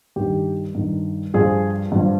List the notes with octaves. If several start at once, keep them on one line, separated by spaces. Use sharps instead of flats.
G2 D#3 G4
G2 D#3
G2 F3 G#4
G2 F3